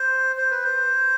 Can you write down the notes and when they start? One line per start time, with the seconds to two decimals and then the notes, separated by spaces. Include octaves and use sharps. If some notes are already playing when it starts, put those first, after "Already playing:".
Already playing: C5
0.38 C5
0.51 B4
0.64 C5